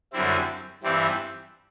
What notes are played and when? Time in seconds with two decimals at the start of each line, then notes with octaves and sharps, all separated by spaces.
0.13 F#2 D3 G3 C4 E4
0.83 G2 E3 G3 C4 E4